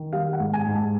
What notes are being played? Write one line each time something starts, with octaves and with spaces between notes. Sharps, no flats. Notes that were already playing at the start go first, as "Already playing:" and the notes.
Already playing: D#3
G3 F5
F#5
G#2
G#5
G#2
A5